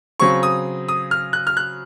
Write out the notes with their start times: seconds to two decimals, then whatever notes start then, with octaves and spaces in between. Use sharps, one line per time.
0.20 C#3 F#3 C4 C#6
0.43 D#6
0.88 D#6
1.11 F6
1.33 F#6
1.47 F6
1.57 F#6